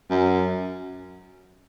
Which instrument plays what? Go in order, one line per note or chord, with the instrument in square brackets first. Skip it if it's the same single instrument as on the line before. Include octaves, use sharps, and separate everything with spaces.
[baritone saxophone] F#2